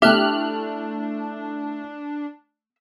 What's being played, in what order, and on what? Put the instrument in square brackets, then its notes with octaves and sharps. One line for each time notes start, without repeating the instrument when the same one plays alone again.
[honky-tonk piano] A3 E4 [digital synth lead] D4 [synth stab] G4 F6 F#6 [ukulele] E5